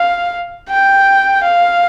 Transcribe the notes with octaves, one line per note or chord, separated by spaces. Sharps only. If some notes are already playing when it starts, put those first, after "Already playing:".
Already playing: F5
G5
F5